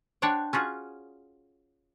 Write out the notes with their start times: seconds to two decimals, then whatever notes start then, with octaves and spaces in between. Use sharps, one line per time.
0.22 D4 C5 C#5 F#5 G5
0.53 C#4 F4 F#4 G#4